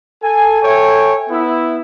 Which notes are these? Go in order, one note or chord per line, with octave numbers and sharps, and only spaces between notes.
A4 G#5
A4 C#5 E5 G5 G#5
B3 E4